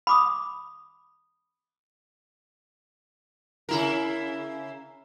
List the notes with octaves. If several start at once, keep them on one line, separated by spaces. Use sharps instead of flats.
B5 D6 D#6
C#3 E4 A#4